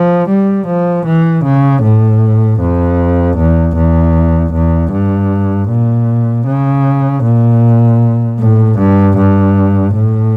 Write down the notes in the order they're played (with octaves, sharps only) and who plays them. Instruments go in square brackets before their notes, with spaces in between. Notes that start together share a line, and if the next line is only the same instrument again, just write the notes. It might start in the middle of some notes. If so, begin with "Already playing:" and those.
Already playing: [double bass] F3
G3
F3
E3
C#3
A2
F2
E2
E2
E2
G2
A#2
C#3
A#2
A2
G2
G2
A2